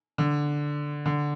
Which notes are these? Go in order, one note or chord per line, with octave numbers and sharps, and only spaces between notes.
D3
D3